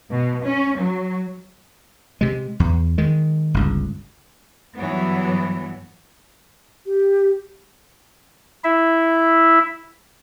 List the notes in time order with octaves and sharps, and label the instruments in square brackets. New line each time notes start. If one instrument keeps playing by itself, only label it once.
[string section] B2
C#4
F#3
[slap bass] C3 G#3
E2
D#3 G#3
G1 C#2
[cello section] G2 E3 F#3 B3
[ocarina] G4
[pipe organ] E4 E5